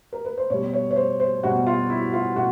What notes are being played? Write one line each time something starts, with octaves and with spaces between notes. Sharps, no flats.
A#4
B4
C5
B2 G3 C#5
C#5
C#5
C5
C5
B2 G3 F#4
F4
E4
F4
B2 F#4